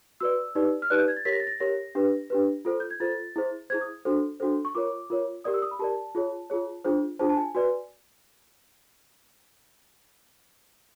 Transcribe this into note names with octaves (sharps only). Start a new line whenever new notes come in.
F#4 B4 D5 E6
D#4 G4 B4 D5
F6
D#4 G4 B4 D5 F#6
G6
G#6
A6
G4 A#4 C#5 B6
A#6
A6
A#6
G4 A#4 C#5 A#6
D4 G4 B4
D4 G4 B4
F4 A4 C5
G6
G#6
F4 A4 C5 A6
E4 G#4 C5
E4 G#4 C5 G#6
D#6
D4 F#4 A4 C5
D4 F#4 A4 C5
C#6
F4 A#4 C#5 D6
F4 A#4 C#5
G4 A#4 D5 D#6
E6
D#6
B5
G4 A#4 D5 A5
F4 G#4 C#5
F4 G#4 C#5
D4 F4 G#4 C5
D4 F4 G#4 C5 A5
A5
G#5
F#4 B4 D5 G#5